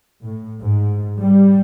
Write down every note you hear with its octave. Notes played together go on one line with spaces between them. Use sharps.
A2
G#2
G3